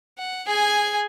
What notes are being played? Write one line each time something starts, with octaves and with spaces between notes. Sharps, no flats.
F#5
G#4 G#5